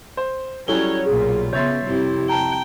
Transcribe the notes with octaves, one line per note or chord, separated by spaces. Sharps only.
C5
F#3 G3 C#4 E4 A4 C#5 G7
B1 A#2 F4 G#4
C#3 B3 C#5 E5 C6 G6 A6
F2 C3 G3 E4 G4
G5 A5 A#5